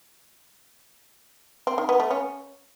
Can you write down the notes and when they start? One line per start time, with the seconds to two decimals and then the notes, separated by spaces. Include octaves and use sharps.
1.67 C4
1.78 D#3
1.89 B3
2.00 A3
2.11 C#4